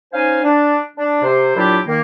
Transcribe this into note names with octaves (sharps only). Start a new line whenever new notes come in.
C#4 D#4 C5 F5 G#5
D4
D4
C3 C5
A#2 F#3 D4 E4 F4 G4
D#3 A#3